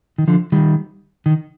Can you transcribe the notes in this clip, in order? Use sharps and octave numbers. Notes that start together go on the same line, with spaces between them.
D#3
D3 F3
D#3 G3
D#3